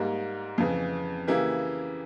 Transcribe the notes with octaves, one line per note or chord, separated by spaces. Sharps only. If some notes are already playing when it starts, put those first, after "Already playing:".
Already playing: G#2 G3 A#3
F2 C#3 E3
C#3 E3 A#3 E4 G4